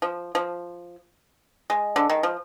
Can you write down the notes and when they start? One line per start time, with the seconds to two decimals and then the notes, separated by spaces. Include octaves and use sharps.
0.02 F3
0.35 F3
1.70 G#3
1.96 D3
2.10 D#3
2.23 F3